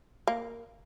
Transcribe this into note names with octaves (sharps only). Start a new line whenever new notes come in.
A#3